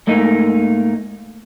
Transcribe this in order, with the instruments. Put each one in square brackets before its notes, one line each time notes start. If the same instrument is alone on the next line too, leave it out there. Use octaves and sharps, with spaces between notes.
[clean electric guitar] G#2 A3 A#3 D#4